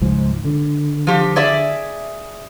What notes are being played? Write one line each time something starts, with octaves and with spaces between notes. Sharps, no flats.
C#2 G#2 F3
D3
F3 G4
G#4 D5 E5